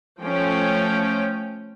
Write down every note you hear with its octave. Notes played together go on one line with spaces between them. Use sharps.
F3 A3 C#4 G5